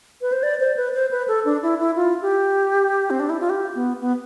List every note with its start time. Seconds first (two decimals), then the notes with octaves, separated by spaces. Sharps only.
0.21 B4
0.32 C5
0.43 D5
0.60 C5
0.77 B4
0.94 C5
1.11 B4
1.28 A4
1.45 D4
1.63 E4
1.79 E4
1.96 F4
2.22 G4
3.10 C4
3.20 D4
3.30 E4
3.40 F4
3.50 G4
3.75 B3
4.01 B3